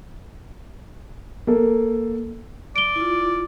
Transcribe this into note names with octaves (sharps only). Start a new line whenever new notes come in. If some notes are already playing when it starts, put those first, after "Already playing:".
A#3 A4
D5 D7 G7
E4 F4